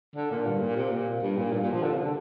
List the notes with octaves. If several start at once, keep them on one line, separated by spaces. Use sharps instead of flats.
D3
A#2
G2
A#2
C3
A#2
G2
A#2
G2
A#2
F3
D3
C3
D3